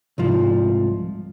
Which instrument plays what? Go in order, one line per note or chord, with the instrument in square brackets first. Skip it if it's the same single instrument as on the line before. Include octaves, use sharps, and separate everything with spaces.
[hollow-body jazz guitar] C2 G#2 F3